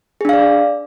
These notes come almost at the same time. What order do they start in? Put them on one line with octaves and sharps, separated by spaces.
G#4 D4 F5 D5